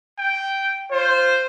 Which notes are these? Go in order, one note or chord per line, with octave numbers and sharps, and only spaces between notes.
G5
F4 C5